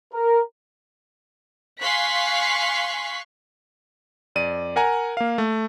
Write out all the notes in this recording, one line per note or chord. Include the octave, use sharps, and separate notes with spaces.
A#4
F5 G#5 C6 C#6 F#6 B6
F2 D5 D#7
A#4 F#5 G#5 A#5
A#3 F5
A3